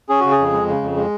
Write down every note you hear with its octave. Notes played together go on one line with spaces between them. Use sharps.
C#4 G#4
C#3 F#4
G#4
F2
G#3
C#3
F2
G#3